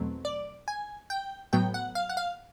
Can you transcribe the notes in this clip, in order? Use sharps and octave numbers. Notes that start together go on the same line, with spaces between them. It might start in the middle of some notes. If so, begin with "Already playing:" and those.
Already playing: E2 B2 F#3 A3 C4
D5
G#5
G5
A2 F#3 B3 G5
F#5
F5
F#5
F5